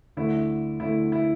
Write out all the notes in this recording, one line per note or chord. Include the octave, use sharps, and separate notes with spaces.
D2 D3 A3 E4
D2 D3 A3 E4
E4